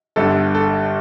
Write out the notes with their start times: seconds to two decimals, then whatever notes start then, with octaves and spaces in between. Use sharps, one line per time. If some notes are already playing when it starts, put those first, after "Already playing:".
0.16 G1 G2 D3 A4
0.55 A4